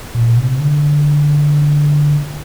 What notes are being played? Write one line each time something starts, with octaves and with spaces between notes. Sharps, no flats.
A#2
C3
D3